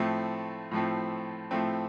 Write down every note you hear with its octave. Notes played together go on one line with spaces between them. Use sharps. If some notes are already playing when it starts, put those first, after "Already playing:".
Already playing: A2 F3 A3 C4
A2 F3 A3 C4
A2 F3 A3 C4